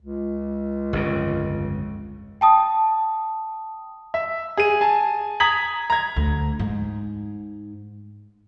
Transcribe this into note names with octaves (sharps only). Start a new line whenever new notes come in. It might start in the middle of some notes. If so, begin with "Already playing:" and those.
C#2
G1 F2 C#3
G5 A5 D#6
E5
G#4 D#7
G#5 A5
A#5 D#6 G#6 B6 F#7
A#5 G#6
D2
G#2